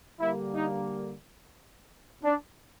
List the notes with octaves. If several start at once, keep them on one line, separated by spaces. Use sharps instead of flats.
D3 G3 A#3 E4
D#4
D4